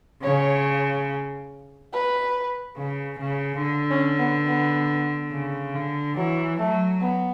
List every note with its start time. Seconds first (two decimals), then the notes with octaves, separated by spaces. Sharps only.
0.23 C#3 C#5
1.93 B4
2.77 C#3
3.19 C#3
3.62 D3
3.90 C#4
4.19 B3
4.47 B3
5.32 C#3
5.75 D3
6.17 E3 F#3
6.59 F#3 A3
7.01 B3